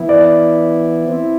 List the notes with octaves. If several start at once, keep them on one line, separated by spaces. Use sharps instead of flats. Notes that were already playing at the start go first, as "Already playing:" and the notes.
Already playing: E3 B3 E4
D5
C4 E4